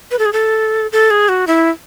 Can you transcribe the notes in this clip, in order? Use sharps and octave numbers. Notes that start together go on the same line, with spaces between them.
B4
A4
G#4
A4
A4
G#4
F#4
E4